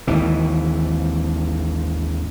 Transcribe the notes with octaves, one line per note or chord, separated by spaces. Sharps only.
G#1 D#2 E3